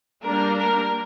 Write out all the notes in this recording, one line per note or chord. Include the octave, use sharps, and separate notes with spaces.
G3 A#3 D4 A#4
A#4